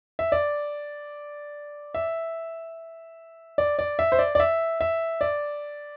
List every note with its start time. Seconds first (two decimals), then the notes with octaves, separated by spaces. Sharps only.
0.19 E5
0.32 D5
1.94 E5
3.58 D5
3.79 D5
3.99 E5
4.12 C5
4.19 D5
4.35 D5
4.40 E5
4.81 E5
5.21 D5